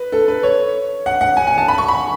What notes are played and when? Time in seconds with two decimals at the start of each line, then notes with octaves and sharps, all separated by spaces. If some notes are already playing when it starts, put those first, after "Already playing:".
Already playing: B4
0.12 A4
0.28 B4
0.43 C#5
1.06 F#5
1.21 F#5
1.37 G#5
1.47 G#5
1.58 A5
1.68 B5
1.78 C#6
1.88 B5